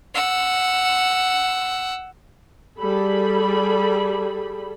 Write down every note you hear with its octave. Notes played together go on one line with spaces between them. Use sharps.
F#5 E6
G3 G#4 A4 B5